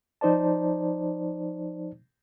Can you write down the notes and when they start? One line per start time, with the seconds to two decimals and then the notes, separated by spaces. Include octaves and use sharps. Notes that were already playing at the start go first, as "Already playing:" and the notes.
0.21 F3 D#4 C5 D5 A5